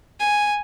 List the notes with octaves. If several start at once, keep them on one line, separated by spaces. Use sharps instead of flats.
G#5